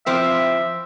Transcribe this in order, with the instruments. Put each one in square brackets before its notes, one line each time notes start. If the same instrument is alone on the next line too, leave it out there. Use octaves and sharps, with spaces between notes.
[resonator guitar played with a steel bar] F3 C4 E4 [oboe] E5